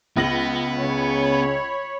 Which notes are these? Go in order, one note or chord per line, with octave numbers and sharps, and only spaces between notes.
C#2 B3 A#6 F#7
C#3 C#5 B5